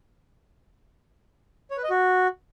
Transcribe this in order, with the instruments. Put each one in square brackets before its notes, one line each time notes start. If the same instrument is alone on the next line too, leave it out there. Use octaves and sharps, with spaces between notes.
[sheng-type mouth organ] C#5
B4
D#5
F#4